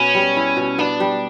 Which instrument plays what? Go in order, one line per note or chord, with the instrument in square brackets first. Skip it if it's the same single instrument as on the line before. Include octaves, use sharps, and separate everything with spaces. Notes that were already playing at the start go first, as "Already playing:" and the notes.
Already playing: [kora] B2 B3 [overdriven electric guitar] C#4
[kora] G3
E4
B2
[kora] B3 [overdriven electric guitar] D4
[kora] G3